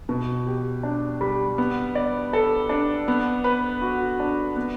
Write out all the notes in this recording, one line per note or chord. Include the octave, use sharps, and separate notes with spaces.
B2
G4
D4
G3
B3
D5
A4
D4
B3
B4
F#4
D4
B3